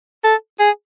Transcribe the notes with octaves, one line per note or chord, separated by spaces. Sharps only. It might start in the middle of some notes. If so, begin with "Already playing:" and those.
A4
G#4